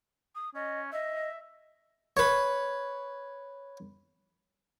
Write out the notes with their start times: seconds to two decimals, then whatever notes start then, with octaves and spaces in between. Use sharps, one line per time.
0.35 D#6
0.55 C#4 D#5
0.92 D#5 E5
2.17 B4 C#5